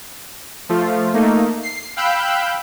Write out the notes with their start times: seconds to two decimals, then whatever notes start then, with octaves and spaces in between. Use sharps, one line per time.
0.69 F3 A3 F4
1.14 A3 A#3 D#4
1.63 C7
1.97 F5 G5 B5 E6 F#6 G6